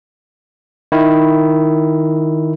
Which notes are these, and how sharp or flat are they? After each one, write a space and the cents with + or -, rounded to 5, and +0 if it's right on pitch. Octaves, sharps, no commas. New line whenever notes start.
D#3 +0 E4 +0